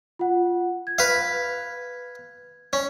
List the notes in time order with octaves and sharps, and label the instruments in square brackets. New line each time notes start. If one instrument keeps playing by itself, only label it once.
[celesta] F4 F#5
G#6
[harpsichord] B4 F5
C#4